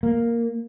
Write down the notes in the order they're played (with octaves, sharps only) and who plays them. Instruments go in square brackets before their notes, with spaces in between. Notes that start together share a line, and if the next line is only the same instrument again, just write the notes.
[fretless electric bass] A#3